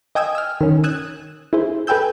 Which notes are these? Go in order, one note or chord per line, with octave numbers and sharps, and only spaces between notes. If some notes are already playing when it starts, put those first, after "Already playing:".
D#5 G5 G#5 D#6 E6
E6 F6
D#3 C#4
D#6 E6 F#6 G#6 E7
E4 G#4 C5
A4 B4 G5 G#5 E6 G6